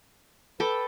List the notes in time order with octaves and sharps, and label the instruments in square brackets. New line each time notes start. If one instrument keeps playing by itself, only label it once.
[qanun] A4 G5 D6 [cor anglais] B4